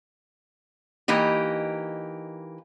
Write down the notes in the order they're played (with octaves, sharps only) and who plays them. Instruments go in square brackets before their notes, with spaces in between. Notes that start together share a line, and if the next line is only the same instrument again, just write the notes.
[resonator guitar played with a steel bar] E3 A#3 D#4 G4